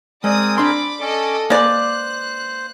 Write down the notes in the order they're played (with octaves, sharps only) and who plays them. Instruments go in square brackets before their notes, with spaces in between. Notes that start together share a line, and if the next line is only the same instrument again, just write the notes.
[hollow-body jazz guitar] G#3 [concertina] C4 G#4 A#4 [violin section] D5 D#6
[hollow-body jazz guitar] D4 C6 [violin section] D5 B5 D6
[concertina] C#4 D5 D6 [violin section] A4 D#5
[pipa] G#3 D5 [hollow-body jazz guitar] A#3 B4 [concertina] C5 [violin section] F#6